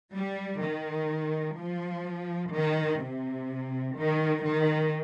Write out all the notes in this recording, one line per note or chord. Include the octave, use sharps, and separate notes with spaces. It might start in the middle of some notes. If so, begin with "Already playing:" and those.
G3
D#3
F3
D#3
C3
D#3
D#3